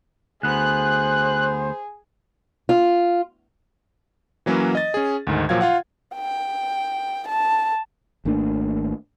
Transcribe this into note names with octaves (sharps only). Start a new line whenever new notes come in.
D2 B3 G#4 C5 F#6
F4
E3 F#3 A#3 C#4 B4
D#5 A6
C#4 G#4
D2 G#2 D#3
A#2 F3 F#3 F5 G#6
F4 F5 F#5
G5
A5
G#1 A3 A#3 D4